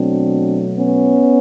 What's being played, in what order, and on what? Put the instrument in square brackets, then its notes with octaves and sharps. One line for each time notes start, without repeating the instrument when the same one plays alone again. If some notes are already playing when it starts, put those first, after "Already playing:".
Already playing: [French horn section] B2 F#3 A3 C4 D4
B3 C#4